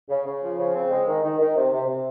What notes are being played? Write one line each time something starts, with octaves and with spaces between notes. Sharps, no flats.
C#3
C#3
F3
C#3
C4
G#3
D#3
D#3
D#3
C3
C3
C3